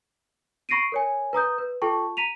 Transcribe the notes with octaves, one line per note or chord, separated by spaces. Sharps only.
B5 C#6 A#6 C7 D7 D#7
A#4 C#5 G#5
B4 A#5 D#6 G6
B4
F4 A4 G5 A5 C#6
A#5 B6 D#7 F7